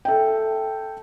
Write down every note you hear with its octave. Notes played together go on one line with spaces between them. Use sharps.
A4 E5 G5